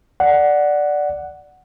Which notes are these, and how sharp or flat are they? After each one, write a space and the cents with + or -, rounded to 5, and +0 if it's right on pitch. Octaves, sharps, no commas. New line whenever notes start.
D5 +0 F#5 +0